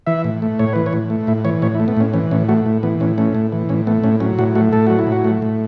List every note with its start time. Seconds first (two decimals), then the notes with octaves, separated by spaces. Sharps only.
0.07 E3 E5
0.24 A2
0.42 A3
0.59 A2 C#5
0.73 E3 B4
0.86 C#5
0.93 A2
1.10 A3
1.27 A2 E4
1.45 E3 C#5
1.62 A2 C#5
1.75 E4
1.80 A3
1.88 B3
1.97 A2 C#4
2.13 E3 C#4
2.31 A2 C#4
2.48 A3 F#4
2.66 A2
2.83 E3 B3
3.00 A2 C#4
3.18 A3 C#4
3.35 A2
3.52 E3
3.69 A2 C#4
3.87 A3 B3
4.03 A2 C#4
4.20 F#3 C#4
4.39 A2 F#4
4.55 A3 F#4
4.73 A2 A4
4.87 F#3 F#4
4.99 E4
5.07 A2
5.12 F#4
5.24 A3
5.42 A2